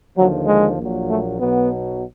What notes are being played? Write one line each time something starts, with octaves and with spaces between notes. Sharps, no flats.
D#2 D3 F3 F#3
G#3
A#1 A#2 F#3
A3
B1 B2 F#3 B3